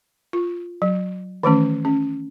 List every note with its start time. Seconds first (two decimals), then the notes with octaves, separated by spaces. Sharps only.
0.33 F4
0.82 F#3
1.43 D#3 E3 A3 C#4
1.85 C#4